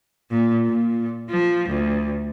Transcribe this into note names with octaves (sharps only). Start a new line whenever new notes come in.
A#2
A#2
F3
D2